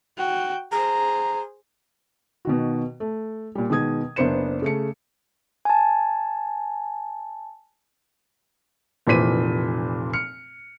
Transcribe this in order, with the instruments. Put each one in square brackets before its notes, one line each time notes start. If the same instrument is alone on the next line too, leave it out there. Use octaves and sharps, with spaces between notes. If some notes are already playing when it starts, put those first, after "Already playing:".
[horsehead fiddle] F#4 G5
[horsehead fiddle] G#4 C5 [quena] A#5
[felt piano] B2 D#3 F#4
A3
A#2 G3
B2 D#3 G#3 D#6 G#6
F#1 B3 D4 C5 C#7 E7
C#3 A3 C#7
[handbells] G#5 A5
[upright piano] F1 A#2 E3 C5 B6 D#7
F6 C#7